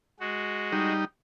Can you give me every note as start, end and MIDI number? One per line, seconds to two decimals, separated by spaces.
0.19 0.92 56
0.19 0.92 66
0.72 1.05 55
0.72 1.05 63